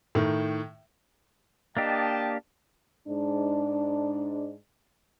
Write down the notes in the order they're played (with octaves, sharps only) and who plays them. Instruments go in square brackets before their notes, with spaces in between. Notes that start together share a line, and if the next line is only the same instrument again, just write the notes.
[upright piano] A2 D#3
[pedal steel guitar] A#3 D4 G4 [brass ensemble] D#5 G5 A5
[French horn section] G#2 D4